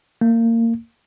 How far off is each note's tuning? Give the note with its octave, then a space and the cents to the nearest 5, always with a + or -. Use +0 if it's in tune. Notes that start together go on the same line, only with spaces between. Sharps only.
A#3 -25